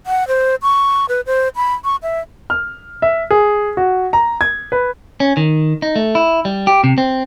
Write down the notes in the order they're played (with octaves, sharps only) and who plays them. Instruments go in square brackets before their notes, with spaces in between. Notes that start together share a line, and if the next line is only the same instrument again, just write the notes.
[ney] F#5
C5
C#6
B4
C5
B5
C#6
E5
[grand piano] F6
E5
G#4
F#4
A#5
G#6
B4
[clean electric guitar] C#4
D#3
D#4
A3
E4
G3
G4
C3
C4